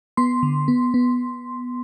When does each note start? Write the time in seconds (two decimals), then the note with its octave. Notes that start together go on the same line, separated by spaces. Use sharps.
0.17 B3 C6
0.43 D3
0.68 B3
0.94 B3